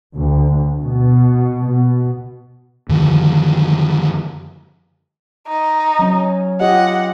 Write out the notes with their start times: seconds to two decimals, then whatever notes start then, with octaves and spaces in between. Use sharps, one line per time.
0.16 D2
0.81 B2
1.67 B2
2.89 F#2 D3 D#3 F3
5.48 D#4
5.99 F#3 C#4
6.61 F4 G4 D#5 F#5